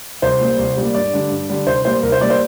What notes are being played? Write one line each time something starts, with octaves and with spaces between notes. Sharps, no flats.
C2 C5
A#2 G3
C2
A#2 G3
G2 D5
D3 G3
G2
D3 G3
C2 C5
A#2 G3 C5
C2 A#4
C5
A#2 G3 D5
C5